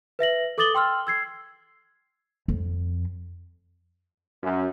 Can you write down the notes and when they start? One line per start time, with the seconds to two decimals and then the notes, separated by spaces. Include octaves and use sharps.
0.19 B4 E5 A#6 F#7
0.58 A4 D6 D#6 A6 F#7 G7
0.75 G5 C6 E6 F6
1.07 E6 G#6 C7
2.48 F2
4.43 F#2